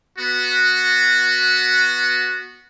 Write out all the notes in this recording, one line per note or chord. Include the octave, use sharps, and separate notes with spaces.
B3 F#4